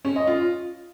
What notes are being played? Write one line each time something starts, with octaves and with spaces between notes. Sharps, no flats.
C#4
D#5
F4